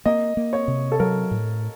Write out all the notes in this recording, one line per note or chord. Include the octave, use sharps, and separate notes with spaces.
A#3 D#5
A#3
C#5
C3
A4
F#3 A#4
A2